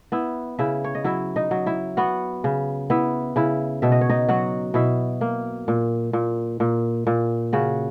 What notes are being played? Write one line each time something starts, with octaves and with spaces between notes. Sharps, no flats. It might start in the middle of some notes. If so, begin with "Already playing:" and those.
B3 E4 E5
C#3 E4 E5
C#5
D#5
F#3 E4 E5
D#4 D#5
F#3
E4 E5
B3 F#4 F#5
C#3
B3 E4 E5
C#3 E4 E5
B2 E5
D#5
C#5
D#4 D#5
F#3 F#4 F#5
B2 E4 E5
A#3
A#2
A#2
A#2
A#2
C#3 F#4 F#5